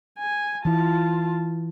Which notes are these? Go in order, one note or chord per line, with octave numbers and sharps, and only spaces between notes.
G#5
E3 E4 F4 A5